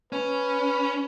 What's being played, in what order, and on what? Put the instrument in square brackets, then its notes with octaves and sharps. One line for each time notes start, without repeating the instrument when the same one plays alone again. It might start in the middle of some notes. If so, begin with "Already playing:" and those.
[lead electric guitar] C#4 [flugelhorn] B4